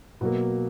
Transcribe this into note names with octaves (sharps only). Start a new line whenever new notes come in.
B2 F#3 A#3